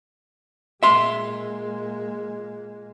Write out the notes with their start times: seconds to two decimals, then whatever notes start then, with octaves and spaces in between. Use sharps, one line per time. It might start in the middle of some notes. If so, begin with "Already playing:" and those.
0.83 A#2 G#3 E5 C6